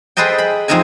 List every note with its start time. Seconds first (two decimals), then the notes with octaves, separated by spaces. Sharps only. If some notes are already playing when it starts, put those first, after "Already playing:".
0.17 G#4 A4 B4 C5 D#5 G5
0.38 B5
0.68 F2 G#3 C4 D#4 A#4 G#5